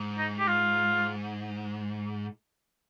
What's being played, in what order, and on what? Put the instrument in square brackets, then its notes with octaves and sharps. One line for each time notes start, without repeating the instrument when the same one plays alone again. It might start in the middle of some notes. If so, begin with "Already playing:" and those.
Already playing: [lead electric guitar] G#2
[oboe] D#4
G4
F4